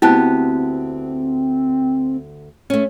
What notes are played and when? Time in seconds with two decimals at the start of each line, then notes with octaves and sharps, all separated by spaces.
0.02 D2 B3 C4 E4 G4 A5 F#6
2.70 A3 C#4